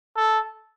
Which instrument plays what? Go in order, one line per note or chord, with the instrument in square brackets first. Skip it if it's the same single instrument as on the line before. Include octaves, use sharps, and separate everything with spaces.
[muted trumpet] A4